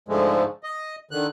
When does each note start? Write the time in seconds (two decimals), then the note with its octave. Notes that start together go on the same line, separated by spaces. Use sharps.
0.08 G#2 D3 F3 G#3 A3
0.64 D#5
1.11 D3 D#3 F#6